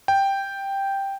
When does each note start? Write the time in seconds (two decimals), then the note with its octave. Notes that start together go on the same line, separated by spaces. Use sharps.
0.08 G5